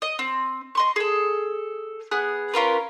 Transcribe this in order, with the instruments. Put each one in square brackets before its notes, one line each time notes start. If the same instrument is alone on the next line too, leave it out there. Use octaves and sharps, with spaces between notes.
[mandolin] D#5
C4
D#5 C6 C#6
G#4 A4
B3 G#4 F#6
C#4 F4 A#4 B4